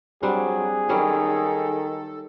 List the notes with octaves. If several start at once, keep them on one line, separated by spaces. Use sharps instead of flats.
F#3 G3 C4 D4 G#4
D#3 F#3 G3 C#4 A4